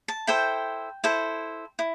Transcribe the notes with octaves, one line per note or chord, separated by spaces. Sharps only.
A5
E4 A4 C5 G5
E4 A4 C5
E4